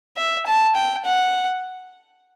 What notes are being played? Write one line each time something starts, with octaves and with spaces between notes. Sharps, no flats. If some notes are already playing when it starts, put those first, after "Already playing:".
E5
A5
G5
F#5